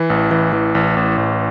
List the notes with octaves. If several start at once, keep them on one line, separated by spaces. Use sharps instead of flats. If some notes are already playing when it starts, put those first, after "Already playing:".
Already playing: E3
A1
E3
E3
A1
A1
A1